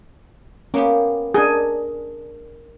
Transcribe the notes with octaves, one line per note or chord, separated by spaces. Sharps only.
A#3 B3 C#4 G4
D4 G#4 A#4 D#5